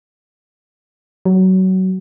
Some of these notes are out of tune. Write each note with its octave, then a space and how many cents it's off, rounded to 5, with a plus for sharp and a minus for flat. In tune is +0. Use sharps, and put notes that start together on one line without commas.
F#3 +20